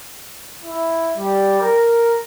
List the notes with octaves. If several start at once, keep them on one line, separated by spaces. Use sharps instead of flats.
E4
G3
A#4